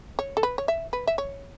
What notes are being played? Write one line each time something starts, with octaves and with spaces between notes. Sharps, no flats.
C#5
A4
B4
C#5
E5
B4
E5
C#5